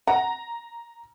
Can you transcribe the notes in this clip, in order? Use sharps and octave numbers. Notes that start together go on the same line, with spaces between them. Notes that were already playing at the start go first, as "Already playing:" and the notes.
F#5 A#5